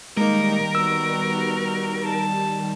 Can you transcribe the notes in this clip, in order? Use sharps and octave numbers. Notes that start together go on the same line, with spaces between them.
D#3 G3 G#3 A#3 D#4 A#4
B3 F#4 E6
A5